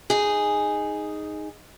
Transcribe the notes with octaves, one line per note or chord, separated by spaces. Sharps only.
D#4 G#4